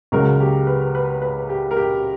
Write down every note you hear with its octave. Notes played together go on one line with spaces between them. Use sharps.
C#2 C#3 F#3 A#4
G4
B4
B4
B4
G4
A#4
G4